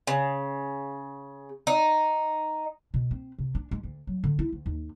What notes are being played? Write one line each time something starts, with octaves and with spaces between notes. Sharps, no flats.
C#3
D#4
B2
C4
C3
D4
G#3
D2
F#3
D3
E4
D2
D#2